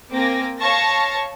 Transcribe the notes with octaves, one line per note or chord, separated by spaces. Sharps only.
A#3 C4 G5 G#5 D6 A#6
C#5 F5 A5 C#6 A#6